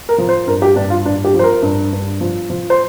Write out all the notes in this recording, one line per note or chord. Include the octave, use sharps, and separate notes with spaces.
A#4
F3
C5
G2 A#4
G4
G2 D4
F4
G2 D4
G4
F3
C5
A#4
G2
G2
F3
F3
C5